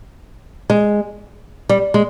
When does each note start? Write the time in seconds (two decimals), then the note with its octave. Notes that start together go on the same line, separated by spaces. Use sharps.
0.70 G#3
1.69 G3
1.94 G#3